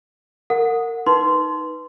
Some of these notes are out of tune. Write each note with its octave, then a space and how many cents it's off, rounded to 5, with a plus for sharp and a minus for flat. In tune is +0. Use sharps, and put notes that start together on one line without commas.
A#4 -25 F#5 -25
D#4 +10 B4 +0 C6 -10